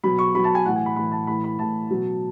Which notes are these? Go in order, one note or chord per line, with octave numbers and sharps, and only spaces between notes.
B2 F#3 B5
C#6
B2 F#3 B5
A5
G#5
A2 E3 F#5
G#5
B5
A2 E3 B5
A5
A2 E3 B5
B5
A2 E3 A5
B2 F#3